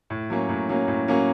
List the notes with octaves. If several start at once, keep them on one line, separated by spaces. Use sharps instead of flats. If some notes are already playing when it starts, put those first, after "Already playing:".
A2
F#3 A#3 C#4
A2
F#3 A#3 C#4
A2
F#3 A#3 C#4